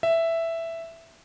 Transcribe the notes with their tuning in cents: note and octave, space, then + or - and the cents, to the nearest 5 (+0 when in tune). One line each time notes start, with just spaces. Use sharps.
E5 +5